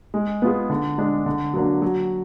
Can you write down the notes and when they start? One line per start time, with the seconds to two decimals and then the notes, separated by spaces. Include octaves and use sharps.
0.14 G#3
0.42 B3 F4 G#4
0.70 D3
0.98 G#3 D4
1.26 D3
1.54 F#3 A#3 D4
1.82 F#3